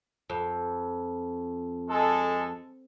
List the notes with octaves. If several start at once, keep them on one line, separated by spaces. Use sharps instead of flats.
F2
G#3 A4